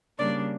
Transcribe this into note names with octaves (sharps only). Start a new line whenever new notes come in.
C#3 G3 A#3 D4 D5